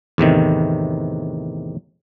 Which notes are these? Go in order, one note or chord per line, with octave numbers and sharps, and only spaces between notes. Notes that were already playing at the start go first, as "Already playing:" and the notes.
E2 A2 C3 D#3